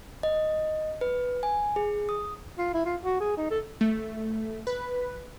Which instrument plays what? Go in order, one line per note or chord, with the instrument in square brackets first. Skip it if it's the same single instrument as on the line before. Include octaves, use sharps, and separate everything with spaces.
[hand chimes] D#5
B4
G#5
G#4
D#6
[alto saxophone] F4
E4
F4
F#4
G#4
D#4
A4
[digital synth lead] A3
B4